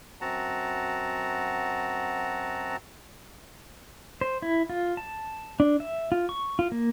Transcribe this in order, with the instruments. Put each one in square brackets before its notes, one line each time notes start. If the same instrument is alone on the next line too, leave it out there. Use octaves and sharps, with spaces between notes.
[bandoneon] F#2 C4 F#4 F#5 A5 A#5
[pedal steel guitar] C5
E4
F4
A5
D4
E5
F4
C#6
F4
A#3